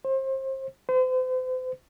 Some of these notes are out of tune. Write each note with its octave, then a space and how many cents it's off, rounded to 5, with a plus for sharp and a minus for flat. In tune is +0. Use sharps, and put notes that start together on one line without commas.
C5 +30
C5 -40